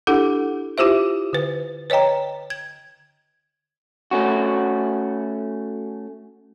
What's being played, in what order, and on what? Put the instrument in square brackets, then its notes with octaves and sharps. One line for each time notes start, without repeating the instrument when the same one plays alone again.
[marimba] D4 E4 G4 A4 F#5
E4 F4 G4 C5 E5
D3 B4
B4 C#5 D#5 G5 A#5
G#6
[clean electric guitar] A3 C#4 F#4